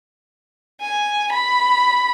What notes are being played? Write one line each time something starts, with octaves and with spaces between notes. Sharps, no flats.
G#5
B5